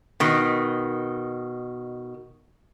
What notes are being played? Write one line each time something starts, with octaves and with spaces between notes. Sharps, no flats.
B2 D#3